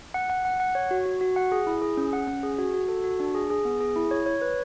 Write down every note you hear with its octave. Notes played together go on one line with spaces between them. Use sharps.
F#5
F#5
F#5
F#5
C#5
F#4
F#4
F#4
F#5
G#4
E4
G#4
C#4
F#5
C#4
G#4
F#4
F#4
A4
F#4
D4
G#4
G#4
B3
G#4
E4
C#5
C#5
B4